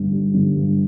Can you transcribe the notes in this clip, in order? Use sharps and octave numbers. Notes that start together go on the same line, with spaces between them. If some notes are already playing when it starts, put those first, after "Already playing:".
Already playing: G1 G2
G3
G1
G2